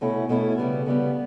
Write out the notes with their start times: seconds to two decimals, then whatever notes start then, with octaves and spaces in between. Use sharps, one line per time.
0.01 B2 A3 C#4 E4
0.29 B2 A3 C#4 E4
0.58 C#3 G3 B3
0.86 C#3 G3 B3